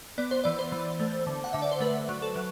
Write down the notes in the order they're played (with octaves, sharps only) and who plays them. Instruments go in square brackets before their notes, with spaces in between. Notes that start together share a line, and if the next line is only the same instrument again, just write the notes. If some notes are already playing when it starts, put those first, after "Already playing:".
[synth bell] B3 D5
C5
E3 D5
C5
E3
A3
D3
F#5
D3 E5
D5
C5
A3 B4
F#3
A4
F#3